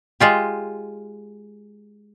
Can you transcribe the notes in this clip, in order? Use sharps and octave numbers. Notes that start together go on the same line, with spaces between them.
G#3 F4 G4